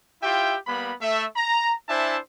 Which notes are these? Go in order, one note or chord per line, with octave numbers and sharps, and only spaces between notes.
E4 F4 G4 E5 G5
G3 A#3 B3 B5
A3 A4 E5
A#5
D4 E4 C5 E5 G#5 A5